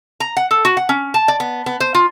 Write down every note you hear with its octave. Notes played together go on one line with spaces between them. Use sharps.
A#5
F#5
A4
F#4
F#5
C#4
A5
D5
B3
B3
C5
F4